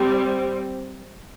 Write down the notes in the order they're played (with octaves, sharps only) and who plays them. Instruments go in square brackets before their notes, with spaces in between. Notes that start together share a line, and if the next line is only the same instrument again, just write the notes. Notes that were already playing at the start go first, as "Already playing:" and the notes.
Already playing: [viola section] G3 C4